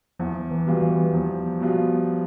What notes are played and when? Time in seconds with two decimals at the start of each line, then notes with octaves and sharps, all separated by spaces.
0.19 E2 F3
0.51 E3
0.66 B2 G3 B3 F4
0.82 E3
1.13 E2 F3
1.60 B2 G3 B3 F4